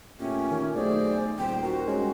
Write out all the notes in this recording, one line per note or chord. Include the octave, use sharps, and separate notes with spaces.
A#2 A3 C#4 G4
D#3
B1 A3 G#4 C5 D5
D#1 C5 G5
F#4 A#4
G#3 C#4 F#4